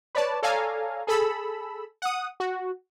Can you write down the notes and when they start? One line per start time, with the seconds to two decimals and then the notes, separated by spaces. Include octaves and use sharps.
0.15 B4 C#5 D5 A5
0.42 A4 C#5 D5 F5 G#5 A#5
1.07 G#4 A4 B5 E6
2.02 F#5 D#6
2.40 F#4